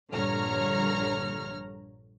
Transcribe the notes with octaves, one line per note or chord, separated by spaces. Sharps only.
A#1 G2 D3 C#5 A#5 F6